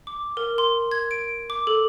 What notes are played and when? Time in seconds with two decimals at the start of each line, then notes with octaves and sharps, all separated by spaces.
0.07 D6
0.37 A#4
0.58 C6
0.91 G#6
1.11 D7
1.50 D6
1.67 A4